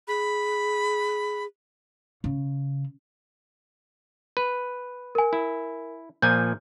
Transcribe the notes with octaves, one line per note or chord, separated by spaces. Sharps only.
G#4 B5
C#3
B4
A#4 G#5
E4
A#2 F3 G#5 G6